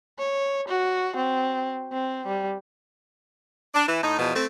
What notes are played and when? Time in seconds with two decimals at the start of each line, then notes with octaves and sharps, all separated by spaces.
0.19 C#5
0.68 F#4
1.16 C4
1.92 C4
2.26 G3
3.74 D4
3.87 E3
4.03 A2 D#4
4.19 E2 B2 F3
4.36 A3 C4